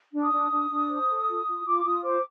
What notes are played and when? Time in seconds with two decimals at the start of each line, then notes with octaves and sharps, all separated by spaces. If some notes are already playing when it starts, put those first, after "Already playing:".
0.12 D4
0.22 D#6
0.32 D4
0.51 D4
0.70 D4
0.89 C5
1.08 A4
1.28 F4
1.46 F4
1.65 F4 D6
1.84 F4 D#6
2.03 C5 D6